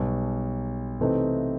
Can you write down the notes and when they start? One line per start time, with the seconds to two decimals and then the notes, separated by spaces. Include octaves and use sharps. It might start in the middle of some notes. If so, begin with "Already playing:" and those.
Already playing: B1 B2 G3
1.00 C3 E3 A3 C4 D#4